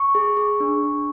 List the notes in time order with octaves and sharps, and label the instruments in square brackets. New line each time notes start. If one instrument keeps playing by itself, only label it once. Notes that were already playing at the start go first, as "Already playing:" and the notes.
Already playing: [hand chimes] C#6
G#4
G#4
D4
D4